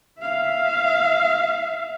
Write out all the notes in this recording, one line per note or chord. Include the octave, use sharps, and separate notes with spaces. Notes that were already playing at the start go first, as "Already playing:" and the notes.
E5 F5